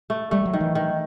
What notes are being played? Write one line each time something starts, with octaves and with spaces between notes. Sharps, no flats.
A3
G3 A3
F#3
D#3
E3
D#3